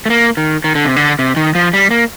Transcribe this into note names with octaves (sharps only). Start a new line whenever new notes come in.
A3
A#3
D#3
D#3
D3
C3
D3
C3
D#3
F3
G3
A#3